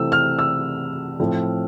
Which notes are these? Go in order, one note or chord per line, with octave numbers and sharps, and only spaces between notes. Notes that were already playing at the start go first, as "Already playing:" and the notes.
Already playing: C3 E3 A3 C4 E6
F6
E6
A2 F3 C4